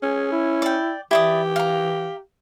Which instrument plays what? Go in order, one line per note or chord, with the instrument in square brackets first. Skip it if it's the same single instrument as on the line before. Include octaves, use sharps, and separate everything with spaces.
[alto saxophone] C#4 [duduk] G#4
[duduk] E4
[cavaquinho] D5 G5
[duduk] E3 [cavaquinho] E4 D5 D#6 [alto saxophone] G4
[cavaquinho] F5 A#5